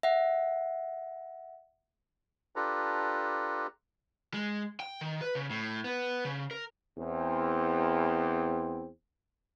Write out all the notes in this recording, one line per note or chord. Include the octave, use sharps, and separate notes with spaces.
E5 F#5
D4 F4 G4 A4 B4 A#5
G#3
G5
D#3
B4
C#3
A2
B3
C#3
A#4
E2 C4